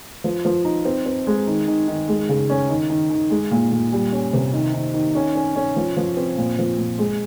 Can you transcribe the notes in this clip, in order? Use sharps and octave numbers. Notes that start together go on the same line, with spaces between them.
F3
F3
D#4
C4
C4
G#3
D#3
D#3
D#3
G#3
C#3
C#4
D#3
D#3
D#3
G#3
A#2
A#2
G3
C#4
C3
D#3
D#3
D#3
C#4
C#4
C#4
F3
F3
C4
A#2
F3
A#2
G#3